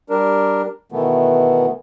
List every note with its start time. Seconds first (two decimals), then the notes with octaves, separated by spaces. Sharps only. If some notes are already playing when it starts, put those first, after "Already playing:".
0.10 G3 D4 A#4
0.92 B2 D#3 E3 A3 B3